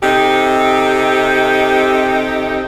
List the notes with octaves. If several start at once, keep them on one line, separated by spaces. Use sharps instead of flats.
C3 D#4 G4 A4